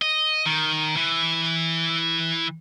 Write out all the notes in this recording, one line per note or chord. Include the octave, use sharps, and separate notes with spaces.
D#5
D#3
E3